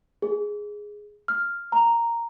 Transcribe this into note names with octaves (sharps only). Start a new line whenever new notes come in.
G#4
F6
A#5